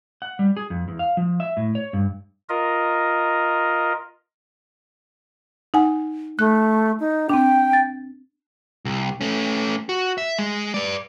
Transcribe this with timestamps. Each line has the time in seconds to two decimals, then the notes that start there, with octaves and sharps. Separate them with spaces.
0.22 F#5
0.39 G3
0.57 G#4
0.70 F2
0.88 E2
0.99 F5
1.17 F3
1.40 E5
1.57 A2
1.75 C#5
1.93 G2
2.49 F4 A#4 D#5
5.74 D#4 F#5 G#5
6.39 A3 F#6
7.00 D#4
7.29 C4 D4 G5
7.73 A6
8.85 C2
9.21 A3 C#4
9.89 F#4
10.18 E5
10.38 G#3
10.74 B4 D5